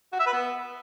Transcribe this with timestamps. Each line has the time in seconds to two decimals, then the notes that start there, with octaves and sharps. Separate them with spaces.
0.12 F#4
0.19 E5
0.26 B4
0.33 B3